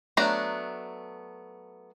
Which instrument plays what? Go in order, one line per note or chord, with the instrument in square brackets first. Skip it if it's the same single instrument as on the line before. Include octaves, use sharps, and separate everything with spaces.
[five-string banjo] F#3 A3 B3 D4 A#5